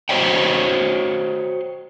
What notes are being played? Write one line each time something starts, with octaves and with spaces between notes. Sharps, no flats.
F#4 C5 C#5 D#5 G5